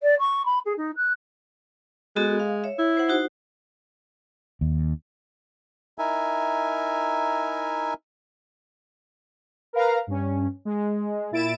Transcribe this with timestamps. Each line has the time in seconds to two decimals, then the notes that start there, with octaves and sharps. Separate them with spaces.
0.03 D5
0.19 C#6
0.45 B5
0.65 G#4
0.77 D#4
0.96 F#6
2.16 G#3 B3 F#4 A4
2.40 F5
2.64 C#5 E5
2.79 E4
2.97 C5 F#5
3.09 D#4 F#4 C5
4.61 D#2
5.99 D#4 E4 A#4 E5 G#5
9.73 A#4 B4 F5 A#5
10.07 G2 C#4
10.65 G#3
11.31 A#2 E4 A6 D7 E7